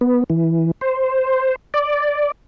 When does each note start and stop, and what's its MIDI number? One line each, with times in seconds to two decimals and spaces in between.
0.01 0.24 59
0.30 0.71 52
0.81 1.55 72
1.74 2.31 74